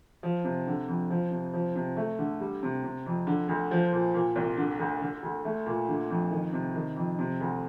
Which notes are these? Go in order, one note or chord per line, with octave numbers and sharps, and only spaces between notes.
F3
C3
D3
F2
F3
C3
F3
C3
A3
D3
G3
C3
C3
F2
D3
D2
F3
A#2
A#2
C2
D3
D2
D3
D2
A3
A#2
D3
F2
D#3
C3
D#3
F2
C3
D2